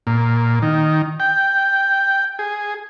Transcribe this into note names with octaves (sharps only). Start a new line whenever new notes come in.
A#2
D#3
G5
G#4